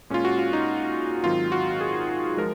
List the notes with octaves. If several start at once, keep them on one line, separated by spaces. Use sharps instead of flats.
A#2 G#3 C#4 F4
F#4
F4
D#4
G#2 D#3 F#3 C4 F4
F#4
G#4
F3 G#3 A#4